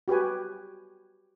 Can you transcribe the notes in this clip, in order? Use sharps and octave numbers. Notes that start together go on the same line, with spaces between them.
F#4 G4 B4 G#5